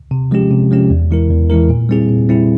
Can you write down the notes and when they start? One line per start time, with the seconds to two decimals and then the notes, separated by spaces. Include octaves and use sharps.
0.11 C3
0.31 F3 G#3 C#4 G4
0.51 C3
0.71 F3 G#3 C#4 G4
0.90 E2
1.11 E3 G#3 E4 A#4
1.30 E2
1.50 E3 G#3 E4 A#4
1.69 A#2
1.89 G3 C4 E4 G#4
2.09 A#2
2.29 G3 C4 E4 G#4